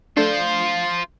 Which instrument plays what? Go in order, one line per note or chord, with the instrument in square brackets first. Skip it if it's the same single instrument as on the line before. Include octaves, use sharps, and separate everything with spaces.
[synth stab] A3 D4 [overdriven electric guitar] F4 C5